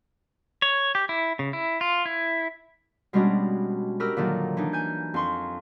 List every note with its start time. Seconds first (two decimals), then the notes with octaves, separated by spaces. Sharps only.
0.62 C#5
0.95 G4
1.09 E4
1.39 C#3
1.53 E4
1.81 F4
2.06 E4
3.13 B2 G3 G#3 C#4 D4 F#4
4.00 F#4 G4 A#4 B4 E6 F6
4.17 A#2 D3 D#3 F#3
4.57 E3 D4 D#4
4.73 G#5 G6
5.14 F2 C6 C#6